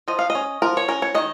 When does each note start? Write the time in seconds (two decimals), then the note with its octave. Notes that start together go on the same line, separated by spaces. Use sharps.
0.08 F3 D#5
0.19 F5
0.30 D#5
0.35 C#4
0.62 F3 A#4
0.77 C#5
0.88 C#4 A#4
1.02 C#5
1.15 D#3 D#5